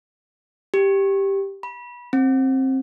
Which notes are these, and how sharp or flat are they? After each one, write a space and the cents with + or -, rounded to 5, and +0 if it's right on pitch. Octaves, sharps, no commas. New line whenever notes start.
G4 +0
B5 -25
C4 +20